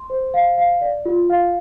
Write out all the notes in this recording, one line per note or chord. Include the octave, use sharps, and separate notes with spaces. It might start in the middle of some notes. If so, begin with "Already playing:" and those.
Already playing: C6
C5
F5
F5
D5
F4
F5